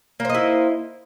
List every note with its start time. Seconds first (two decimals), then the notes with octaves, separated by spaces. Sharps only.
0.20 A#3
0.25 C5
0.30 D#5
0.34 E4